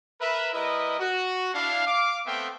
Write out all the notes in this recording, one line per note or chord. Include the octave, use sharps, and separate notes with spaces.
A#4 B4 E5
G3 E4 A#4 B4 D#5
F#4
D4 E4 F5
F5 D6
A3 B3 C4 E5 F5 G5